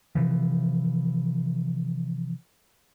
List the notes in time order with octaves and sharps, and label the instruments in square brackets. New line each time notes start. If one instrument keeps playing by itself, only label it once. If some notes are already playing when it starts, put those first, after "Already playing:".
[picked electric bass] C3 E3 F3